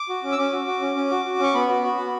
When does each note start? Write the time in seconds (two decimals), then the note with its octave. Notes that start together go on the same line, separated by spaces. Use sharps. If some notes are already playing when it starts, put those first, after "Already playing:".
Already playing: D6
0.09 F#4
0.23 C#4
0.32 E6
0.38 C#4 D6
0.53 F#4
0.67 F#4
0.82 C#4
0.96 C#4
1.11 F#4
1.26 F#4
1.39 C#4 C#6
1.54 B3 B5
1.69 F#4
1.84 F#4
1.98 B3